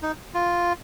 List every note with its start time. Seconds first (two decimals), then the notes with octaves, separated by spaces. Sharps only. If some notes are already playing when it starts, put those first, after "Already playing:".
0.02 D#4
0.34 F4